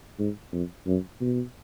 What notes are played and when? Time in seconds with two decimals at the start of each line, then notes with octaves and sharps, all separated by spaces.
0.19 G#2
0.52 F2
0.86 F#2
1.21 B2